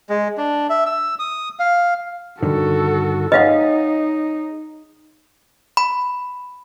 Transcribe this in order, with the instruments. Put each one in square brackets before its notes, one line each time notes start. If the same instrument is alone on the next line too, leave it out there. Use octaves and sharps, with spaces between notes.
[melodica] G#3
D4
E5
E6
D#6
F5
[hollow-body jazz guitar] G2 D3 D#3 [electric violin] F#4 A4
[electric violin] D#4 [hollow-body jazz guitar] G#4 C#5 [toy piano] D#5 F5 F#5
[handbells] B5